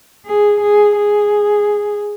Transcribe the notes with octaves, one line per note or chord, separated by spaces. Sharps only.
G#4
G#4
G#4